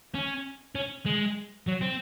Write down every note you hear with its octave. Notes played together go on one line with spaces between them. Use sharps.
C#4
C#4
G#3
F#3
C4